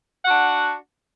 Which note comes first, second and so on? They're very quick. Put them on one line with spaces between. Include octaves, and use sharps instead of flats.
F#5 F#4 D4